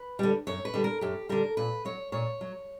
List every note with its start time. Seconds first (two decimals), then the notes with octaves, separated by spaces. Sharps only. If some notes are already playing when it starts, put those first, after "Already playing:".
Already playing: B4
0.19 D3 G3
0.47 F#2 C#5
0.65 B4
0.74 D3 G3
0.84 A#4
1.01 F#2 G4
1.29 D3 G3 A#4
1.57 A#2 B4
1.85 F#3 C#5
2.12 A#2 C#5
2.41 F#3